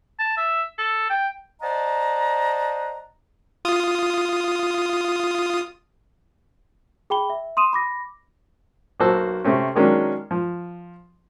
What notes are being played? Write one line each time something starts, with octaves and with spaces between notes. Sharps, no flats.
A5
E5
A4
G5
C5 D5 D#5 F#5 A5 A#5
F4 D#6
G#4 G5 B5 G7
E5
C6 D#6 D#7 E7
B5 D6 A#6
B1 A#3 F#4 C5 A5 E6
C3 A3 C4 C#4
D#3 F#3 G#3 A#3 C#4 D4
F3